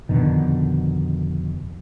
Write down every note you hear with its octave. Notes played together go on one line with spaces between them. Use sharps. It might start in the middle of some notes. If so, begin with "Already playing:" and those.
F2 B2 D3 D#3